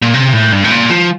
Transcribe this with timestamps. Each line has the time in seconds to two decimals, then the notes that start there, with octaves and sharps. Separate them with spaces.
0.02 A#2
0.14 C3
0.33 A2
0.52 G2
0.64 A2
0.71 A#2
0.90 F3